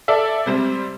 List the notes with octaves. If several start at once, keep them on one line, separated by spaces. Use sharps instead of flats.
A4 D5 E5
C3 G3 C4